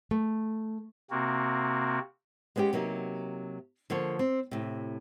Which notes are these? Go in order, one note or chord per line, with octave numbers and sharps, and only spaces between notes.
A3
C3 A#3 C4 F#4
G#3 B3 C#4 F#4 G4
C3 F#3 A#3 D#4 G4
D3 F3 A#3 C#5
C4
A2 C3